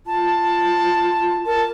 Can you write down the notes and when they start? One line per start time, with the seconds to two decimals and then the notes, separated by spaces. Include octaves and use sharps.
0.06 F4 A5
1.45 A#4 A5